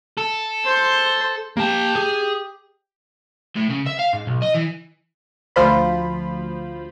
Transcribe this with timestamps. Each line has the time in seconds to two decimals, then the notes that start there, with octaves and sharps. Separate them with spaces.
0.18 A4
0.65 C5 C6
1.57 A#3 G4 A5
1.96 G#4
3.57 A2
3.70 C#3
3.87 E5
3.99 F5
4.13 G#2
4.27 B1
4.42 D#5
4.54 E3
5.56 D2 F3 F4 C5 B5